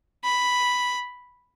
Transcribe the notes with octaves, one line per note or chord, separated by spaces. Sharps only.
B5